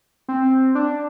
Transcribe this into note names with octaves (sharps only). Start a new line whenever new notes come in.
C4
D4